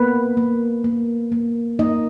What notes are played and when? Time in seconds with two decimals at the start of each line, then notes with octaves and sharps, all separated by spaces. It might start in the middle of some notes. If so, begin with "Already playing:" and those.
Already playing: A#3 B3 B4
0.37 A#3
0.84 A#3
1.32 A#3
1.79 A#3 D#4 D#5